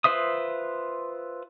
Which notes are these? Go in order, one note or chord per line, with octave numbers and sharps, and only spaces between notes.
F4 B4 C5 E5 D#6